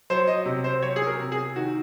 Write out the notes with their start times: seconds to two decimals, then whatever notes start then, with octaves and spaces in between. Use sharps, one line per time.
0.10 F#3 C5
0.27 D#5
0.45 C3
0.64 C5
0.82 F#3 C#5
0.96 G#4
1.07 A#4
1.20 C3
1.32 G#4
1.56 D#3 F#4